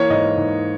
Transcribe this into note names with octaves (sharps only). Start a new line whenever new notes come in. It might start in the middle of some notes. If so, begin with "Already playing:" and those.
Already playing: E3 A#3 C#5
G#2 D#5
G#2